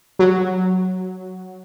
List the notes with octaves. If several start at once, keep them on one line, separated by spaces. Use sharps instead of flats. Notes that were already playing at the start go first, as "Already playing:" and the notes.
F#3